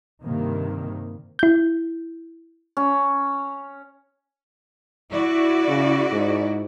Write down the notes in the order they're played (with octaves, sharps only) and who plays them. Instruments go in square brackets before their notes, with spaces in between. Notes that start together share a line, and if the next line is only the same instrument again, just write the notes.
[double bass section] G2 C3 D#3 A#3
[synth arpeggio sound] E4 G6
[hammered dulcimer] C#4
[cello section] E4 F#4 D5
[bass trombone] C#3
G#2